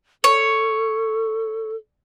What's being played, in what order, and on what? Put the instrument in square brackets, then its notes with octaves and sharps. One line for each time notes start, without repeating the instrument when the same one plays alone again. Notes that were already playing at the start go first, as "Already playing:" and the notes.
[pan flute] A4 [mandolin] C#5